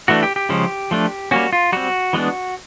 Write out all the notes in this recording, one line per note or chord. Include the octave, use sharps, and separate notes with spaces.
E3 A3 D4 F#4
G4
G4
C#3 F3 G#3 C#4
F3 A3 D4
G3 A#3 C#4 F#4
F4
G3 C4 F#4
E3 G#3 B3 D4